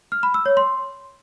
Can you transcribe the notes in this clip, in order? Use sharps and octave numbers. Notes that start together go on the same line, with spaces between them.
F6
B5
E6
C#5
C6